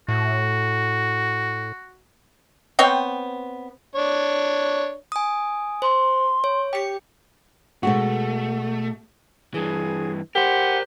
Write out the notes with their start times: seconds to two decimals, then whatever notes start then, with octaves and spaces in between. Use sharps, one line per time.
0.08 A2 F#4
2.79 B3 C4 C#5 G5
3.95 D4 C#5
5.12 G#5 D#6
5.82 C5 C6
6.44 C#5
6.73 G4 G5 C#7
7.83 B2 G#3 A3 F#4
9.54 G2 E3 G#4
10.35 G4 A#4 C5 F#5